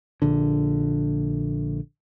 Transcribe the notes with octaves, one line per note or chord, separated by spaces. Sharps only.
A#1 D3